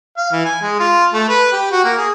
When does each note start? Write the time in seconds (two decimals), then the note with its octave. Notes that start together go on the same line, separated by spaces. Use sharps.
0.17 F5
0.32 E3
0.45 G#5
0.62 G#3
0.80 F4
1.13 A3
1.29 B4
1.52 G4
1.72 F#4
1.84 A#3
1.98 G#4